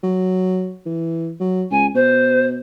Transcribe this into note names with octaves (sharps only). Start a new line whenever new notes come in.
F#3
E3
F#3
C#2 G#5
B2 C5